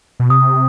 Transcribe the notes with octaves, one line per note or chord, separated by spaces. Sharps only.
B2
C3 D#6